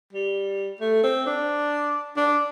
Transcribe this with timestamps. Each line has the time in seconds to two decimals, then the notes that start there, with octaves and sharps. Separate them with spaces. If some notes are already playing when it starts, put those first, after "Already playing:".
0.13 G3
0.80 A3
1.03 C4
1.26 D4
2.17 D4